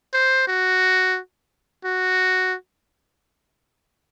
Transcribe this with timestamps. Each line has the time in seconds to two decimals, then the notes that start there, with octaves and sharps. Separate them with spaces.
0.14 C5
0.47 F#4
1.85 F#4